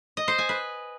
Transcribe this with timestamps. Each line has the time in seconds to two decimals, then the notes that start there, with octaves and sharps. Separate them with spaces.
0.17 D#5
0.28 C5
0.38 G#5
0.49 B4